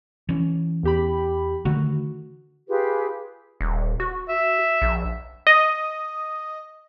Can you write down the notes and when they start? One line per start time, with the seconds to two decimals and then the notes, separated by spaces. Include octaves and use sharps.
0.29 E3 C#4
0.83 E2 G4 B5
1.65 D3 D#3 A3 F#4
2.68 F4 G4 G#4 B4
3.61 D#1
4.00 F#4
4.29 E5
4.82 A#1
5.47 D#5